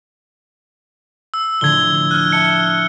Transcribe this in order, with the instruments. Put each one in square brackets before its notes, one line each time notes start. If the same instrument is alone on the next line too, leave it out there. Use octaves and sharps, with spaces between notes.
[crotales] E6
[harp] A2 D3 F3 [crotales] G#6 G7
[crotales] F6 F#6
[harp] E5 A5 [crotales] C#7